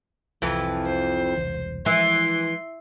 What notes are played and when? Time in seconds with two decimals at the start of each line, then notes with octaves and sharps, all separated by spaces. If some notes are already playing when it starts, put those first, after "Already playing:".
0.42 C2 F2 E3 F3
0.86 C5
1.37 E1 C2 E3
1.86 E3 F3 G#3 C6